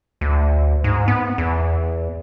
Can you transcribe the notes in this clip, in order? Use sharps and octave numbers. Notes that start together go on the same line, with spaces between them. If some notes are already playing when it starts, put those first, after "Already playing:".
D2
G#2
B3
E2